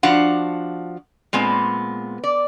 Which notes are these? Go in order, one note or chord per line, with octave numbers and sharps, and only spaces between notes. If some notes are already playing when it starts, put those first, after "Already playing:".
F3 D4 F#4 F5 F#5
A#2 G#3 B3 C4
D5